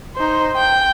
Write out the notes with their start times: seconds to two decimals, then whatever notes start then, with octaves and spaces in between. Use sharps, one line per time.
0.16 D#4 C5
0.56 G5